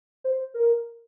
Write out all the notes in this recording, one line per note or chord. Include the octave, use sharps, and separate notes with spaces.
C5
A#4